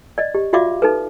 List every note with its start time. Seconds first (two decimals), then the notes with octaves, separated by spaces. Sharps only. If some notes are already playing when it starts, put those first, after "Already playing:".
0.18 D5 D#5
0.34 G4
0.53 F4 F#4 D5 E5 F5 D6
0.82 D#4 A4 B4